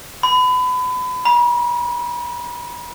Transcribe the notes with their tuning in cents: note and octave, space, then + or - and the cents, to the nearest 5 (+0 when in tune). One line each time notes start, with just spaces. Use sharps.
B5 +30
B5 -45